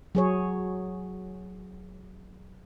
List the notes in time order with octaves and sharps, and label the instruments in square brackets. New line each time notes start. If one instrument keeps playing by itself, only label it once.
[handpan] F#3 G#4 C#5